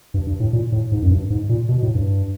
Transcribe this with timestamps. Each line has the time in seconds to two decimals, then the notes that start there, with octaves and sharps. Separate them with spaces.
0.14 G2
0.27 G2
0.40 A2
0.53 A#2
0.72 A2
0.92 G#2
1.02 F#2
1.11 G2
1.30 G#2
1.49 A#2
1.69 B2
1.83 A2
1.95 G2